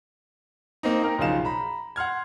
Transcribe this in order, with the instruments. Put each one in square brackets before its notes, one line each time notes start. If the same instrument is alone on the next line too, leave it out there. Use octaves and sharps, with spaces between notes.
[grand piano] A#3 C4 D#4
D#4 A#4 G5
B1 C#3 F3 D#4 F5 E7
A#5 B5
F#5 C6 F6 G#6